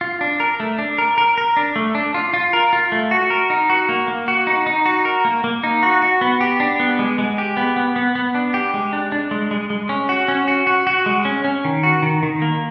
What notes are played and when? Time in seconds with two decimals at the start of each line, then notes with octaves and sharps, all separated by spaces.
0.01 F4
0.21 D4
0.40 A#4
0.60 A3
0.78 D4
0.98 A#4
1.18 A#4
1.38 A#4
1.57 D4
1.76 A3
1.95 D4
2.14 F4
2.34 F4
2.53 A#4
2.73 F4
2.92 A3
3.11 F#4
3.30 A#4
3.50 D#4
3.70 F#4
3.89 A#3
4.08 A#3
4.28 F#4
4.47 D#4
4.66 D#4
4.86 F#4
5.05 A#4
5.25 A#3
5.44 A#3
5.63 D#4
5.83 F#4
6.02 F#4
6.21 B3
6.41 G4
6.60 D4
6.80 B3
6.99 G#3
7.18 G#3
7.38 G4
7.57 B3
7.76 B3
7.96 B3
8.15 B3
8.35 D4
8.54 G4
8.74 G#3
8.93 D4
9.12 D4
9.31 G#3
9.51 G#3
9.70 G#3
9.89 C#4
10.09 F#4
10.28 C#4
10.48 F#4
10.67 F#4
10.87 F#4
11.06 G#3
11.25 C#4
11.44 C#4
11.64 D#3
11.83 F#4
12.02 D#3
12.23 D#3
12.42 A#3